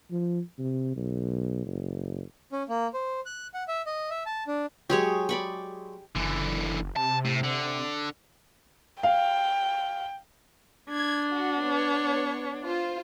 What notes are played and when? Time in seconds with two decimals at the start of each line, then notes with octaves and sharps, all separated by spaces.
0.11 F3
0.58 C3
0.96 B1
1.66 F#1
2.52 C#4
2.69 A#3
2.94 C5
3.26 F#6
3.54 F#5
3.68 E5
3.86 D#5
4.10 E5
4.26 A5
4.47 D4
4.90 F#3 G#3 G4 G#4 C#5
5.29 D5 B5 C#6
6.15 F#1 D3 E3
6.96 C3 A5
7.25 A2
7.44 D3
9.03 F5 G5
10.90 D4 G#6
11.29 F#4
11.61 B3 C#5
12.64 F4 C5